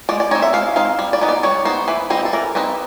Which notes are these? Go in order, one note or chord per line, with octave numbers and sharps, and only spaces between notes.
G#3 D5
D5
C4 D#4 C#5
E5
G#3 F5
C4 D#4 F5
G3
D5
B3 D#4
D5
G3 C#5
B3 D#4 C5
E3 B4
G3 C4 D#4
A4
E3 A#4
G3 C4 D#4 B4